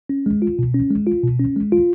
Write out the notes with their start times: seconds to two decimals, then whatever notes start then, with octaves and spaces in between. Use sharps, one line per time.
0.09 C#4
0.26 G#3
0.42 F4
0.59 B2
0.74 C#4
0.91 G#3
1.07 F4
1.24 B2
1.39 C#4
1.56 G#3
1.72 F4